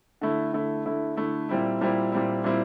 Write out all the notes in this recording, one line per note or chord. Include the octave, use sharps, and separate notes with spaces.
D3 A3 E4
D3 A3 E4
D3 A3 E4
D3 A3 E4
A#2 G3 C4 E4
A#2 G3 C4 E4
A#2 G3 C4 E4
A#2 G3 C4 E4